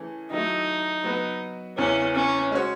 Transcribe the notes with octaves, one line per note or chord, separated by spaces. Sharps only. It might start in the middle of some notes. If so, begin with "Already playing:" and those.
Already playing: E3 A3 C#4 G#4
D#3 F#3 A3 D#4 E4
F#3 B3 F#4 B4
E2 C#3 E3 C#4
C#4
G#3 C#4 F#4 C#5